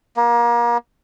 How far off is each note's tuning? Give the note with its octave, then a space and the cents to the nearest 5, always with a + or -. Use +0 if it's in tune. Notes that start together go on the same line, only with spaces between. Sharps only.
A#3 +30